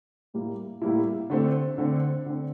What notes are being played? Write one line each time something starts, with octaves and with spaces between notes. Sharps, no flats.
A2 G3 A#3 E4
A2 G3 A#3 E4
D3 A3 C4
D3 A3 C4
D3 A3 C4